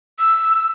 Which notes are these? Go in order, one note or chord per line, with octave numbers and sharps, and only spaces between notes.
E6